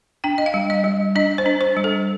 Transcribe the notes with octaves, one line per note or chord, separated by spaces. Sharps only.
D4 G5
D#5
F5
G3
D#5
G3
D4 D#5
C5
D4
C5
G3
A4